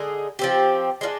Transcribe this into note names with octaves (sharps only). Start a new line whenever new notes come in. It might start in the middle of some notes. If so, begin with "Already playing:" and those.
Already playing: D3 G#3 D#4 G#4
F3 C4 G4
G#3 D4 F4